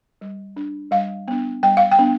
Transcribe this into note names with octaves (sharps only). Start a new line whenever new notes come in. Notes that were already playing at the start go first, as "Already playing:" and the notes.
G3
D4
G3 F5
B3 D4
G3 G5
F5
G5
B3 D4